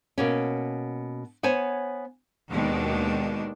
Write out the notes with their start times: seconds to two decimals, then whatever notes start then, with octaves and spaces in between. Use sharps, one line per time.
0.18 B2 A#3 C#4
1.43 B3 C5 C#5 G#5
2.50 D#2 B2 D#3 G#3 D4